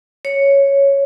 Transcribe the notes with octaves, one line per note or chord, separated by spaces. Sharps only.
C#5